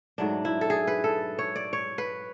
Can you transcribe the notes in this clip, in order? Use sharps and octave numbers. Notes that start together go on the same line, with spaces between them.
G#2 F#3 A3 D4
E4
A4
G#4
B4
A4
C#5
D5
C#5
B4